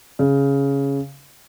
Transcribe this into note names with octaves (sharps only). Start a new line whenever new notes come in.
C#3